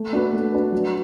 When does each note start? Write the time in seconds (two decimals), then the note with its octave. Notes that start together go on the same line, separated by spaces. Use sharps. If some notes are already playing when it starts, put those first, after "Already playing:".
Already playing: A3
0.13 D4 F#4 B4
0.33 A3
0.52 D4 F#4 B4
0.72 F#3